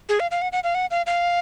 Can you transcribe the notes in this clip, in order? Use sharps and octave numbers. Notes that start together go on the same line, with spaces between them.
G#4
F5
F5
F#5
F#5
F5
F#5
F5
F5